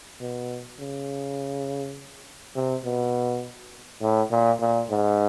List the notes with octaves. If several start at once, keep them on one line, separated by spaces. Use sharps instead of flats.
B2
C#3
C3
B2
A2
A#2
A#2
G#2